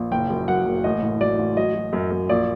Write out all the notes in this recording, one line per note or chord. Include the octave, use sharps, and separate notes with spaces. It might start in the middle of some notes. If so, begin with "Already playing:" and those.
Already playing: A#1
F#1 G5
F#2
F#3 F#5
F#1
A1 D#5
A2
F#3 D5
A1
F#3 D#5
F#3
F#2
F#2
A#1 D5